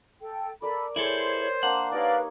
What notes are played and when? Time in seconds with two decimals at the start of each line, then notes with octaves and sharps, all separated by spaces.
0.21 A4 G5
0.62 A4 A#4 D5 B5
0.96 E4 G#4 A4 C5 C#5
1.63 A#3 D4 F#5
1.92 D#4 G4 A#4 B4 C#5 D5 F5